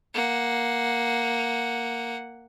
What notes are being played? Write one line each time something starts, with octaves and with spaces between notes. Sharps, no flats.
A#3 F#5